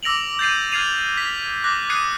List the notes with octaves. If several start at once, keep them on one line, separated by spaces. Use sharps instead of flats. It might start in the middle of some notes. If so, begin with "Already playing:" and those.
D6 E6 A#6 D7 F7 F#7
G6 A6 C7 D#7
F6 G#6 A6 C7 D#7 F7
B6
D6 F#6 A#6
D#6 F#6 G#6 C7 C#7 D#7